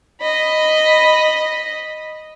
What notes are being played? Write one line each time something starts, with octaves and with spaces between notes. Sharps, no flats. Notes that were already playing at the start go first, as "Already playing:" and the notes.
D#5 B5